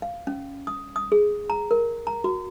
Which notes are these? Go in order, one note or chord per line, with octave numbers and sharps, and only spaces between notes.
F5
C#4
D#6
D#6
G#4
A#5
A#4
A#5
F#4